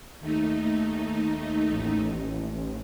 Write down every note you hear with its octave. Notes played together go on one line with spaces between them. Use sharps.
D#2 A3 D#4
A1